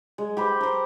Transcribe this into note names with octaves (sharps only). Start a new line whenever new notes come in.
G#3
G4 B4 C5
A#4 C5